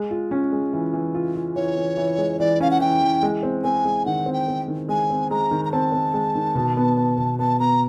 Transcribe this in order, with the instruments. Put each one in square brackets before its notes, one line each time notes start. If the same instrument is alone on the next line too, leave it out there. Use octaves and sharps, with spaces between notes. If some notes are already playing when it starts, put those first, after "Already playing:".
Already playing: [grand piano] G#3
F4
C#4
G#3
E3
E3
F4
F4
[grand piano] E3 [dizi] C#5
[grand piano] E3
E3
G#3
[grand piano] E3 [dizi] D5
[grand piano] C#4 [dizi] F5
[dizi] F#5
[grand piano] E3 [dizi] G5
[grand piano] E3
G#3
C4
[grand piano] C4 [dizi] G#5
[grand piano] G#3
[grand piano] D#3 [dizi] F#5
[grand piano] C4
[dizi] G5
[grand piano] C4
D#3
[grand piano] G#3 [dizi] G#5
[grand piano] C4
[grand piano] G#3 [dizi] A#5
[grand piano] D#3
[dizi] A#5
[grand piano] C4 [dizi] A5
[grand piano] C4
G#3
D#3
B2
B3
B3
B2
[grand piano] B3 [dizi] A5
[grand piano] B3 [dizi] A#5